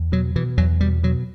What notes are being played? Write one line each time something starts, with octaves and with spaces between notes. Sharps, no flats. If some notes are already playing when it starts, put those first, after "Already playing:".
Already playing: E2
B2 F#3
B2 E3
E2 F#3
B2 G3
B2 F#3